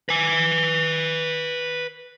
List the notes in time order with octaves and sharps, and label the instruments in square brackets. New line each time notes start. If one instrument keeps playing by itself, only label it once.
[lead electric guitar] B4 G#5